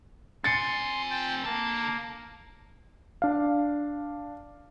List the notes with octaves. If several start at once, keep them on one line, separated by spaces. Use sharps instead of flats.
C4 G#5 C6 A6 C#7
G5 A5
D3 A#3 A5
D4 F5